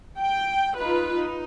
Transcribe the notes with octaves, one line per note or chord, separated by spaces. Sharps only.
G5
D#4 F4 B4
D#4